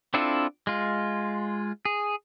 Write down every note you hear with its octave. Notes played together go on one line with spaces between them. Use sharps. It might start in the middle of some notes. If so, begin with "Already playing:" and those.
C4 D4 E4 F4 A4
G#3 F4
G#4